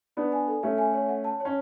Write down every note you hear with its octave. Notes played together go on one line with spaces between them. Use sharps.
B3 D4 D5
G#5
A4
A3 C#4 E5
G#5
C#5
F#5
A5
C#4 C#5